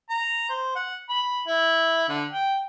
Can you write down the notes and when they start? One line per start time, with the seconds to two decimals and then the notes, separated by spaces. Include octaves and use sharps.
0.10 A#5
0.49 C5
0.75 F#5
1.09 B5
1.47 E4
2.09 D3
2.32 G5